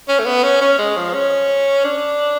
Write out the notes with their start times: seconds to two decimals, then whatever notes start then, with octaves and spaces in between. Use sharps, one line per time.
0.09 C#4
0.19 A3
0.26 B3
0.44 C#4
0.61 C#4
0.79 G#3
0.97 F3
1.14 C#4
1.84 D4